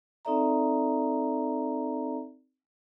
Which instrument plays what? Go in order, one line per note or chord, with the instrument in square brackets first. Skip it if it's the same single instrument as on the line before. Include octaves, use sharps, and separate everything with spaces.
[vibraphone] C4 D#4 A4 D5 E5 A#5